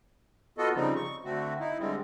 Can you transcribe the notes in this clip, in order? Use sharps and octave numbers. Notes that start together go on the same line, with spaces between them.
B3 F4 F#4 A4 D#5
C#3 F3 G3 C4 D#4
C#6
D3 A3 C4 F#4
D#4 E4
D3 G3 G#3 C4